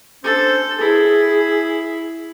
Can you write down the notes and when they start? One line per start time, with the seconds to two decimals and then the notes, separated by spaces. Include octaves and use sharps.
0.24 C#4 D4 A4 C5
0.80 E4 G#4